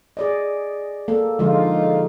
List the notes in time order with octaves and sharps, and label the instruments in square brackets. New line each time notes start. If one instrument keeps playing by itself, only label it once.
[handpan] G#4 D5 D#5
A#3 A4
[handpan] D3 F3 G#3 [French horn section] D#4 F4